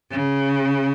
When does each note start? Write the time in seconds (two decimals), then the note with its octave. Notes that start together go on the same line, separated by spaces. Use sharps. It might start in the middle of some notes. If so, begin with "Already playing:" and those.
0.11 C#3